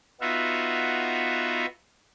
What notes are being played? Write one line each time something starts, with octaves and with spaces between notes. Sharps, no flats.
B3 D#4 F4 F#4 E5